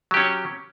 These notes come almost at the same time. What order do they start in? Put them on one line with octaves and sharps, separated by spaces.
F#3 G4 C#4